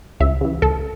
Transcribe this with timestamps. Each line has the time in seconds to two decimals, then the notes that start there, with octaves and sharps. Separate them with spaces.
0.20 C#2 E5
0.41 C#3 E3
0.62 C#2 A4